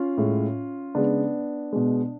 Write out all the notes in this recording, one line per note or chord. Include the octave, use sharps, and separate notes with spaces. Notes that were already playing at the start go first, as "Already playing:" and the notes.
Already playing: C#4 F4
A2 G#3
C#3 G#3 B3 D4
B2 G#3